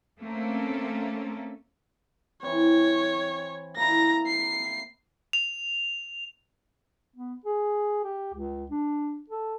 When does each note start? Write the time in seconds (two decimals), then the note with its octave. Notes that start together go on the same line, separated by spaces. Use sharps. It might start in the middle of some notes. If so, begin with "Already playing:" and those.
0.20 A3 A#3 C4 C#4 A4 A#4
2.43 E3 C4 C#5
3.76 A#3 E4 A#5 A#6
4.27 C7
5.33 F7
7.16 B3
7.46 G#4
8.04 G4
8.34 C#2
8.71 D4
9.29 A4